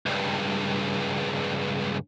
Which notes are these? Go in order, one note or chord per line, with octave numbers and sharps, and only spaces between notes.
C#2 G2